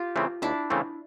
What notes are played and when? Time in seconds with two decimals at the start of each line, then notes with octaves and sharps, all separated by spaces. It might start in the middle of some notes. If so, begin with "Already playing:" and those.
Already playing: F4 G4
0.16 C#3 E3 A3 C4
0.42 D#2 D4 E4
0.70 C#3 E3 A3 C4